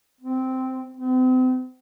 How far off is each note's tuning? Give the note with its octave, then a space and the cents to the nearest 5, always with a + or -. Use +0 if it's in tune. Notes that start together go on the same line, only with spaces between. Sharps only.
C4 -10
C4 -40